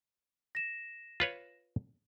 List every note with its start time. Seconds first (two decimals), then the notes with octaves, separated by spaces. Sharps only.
0.55 A#6 E7
1.20 F4 B4 C#5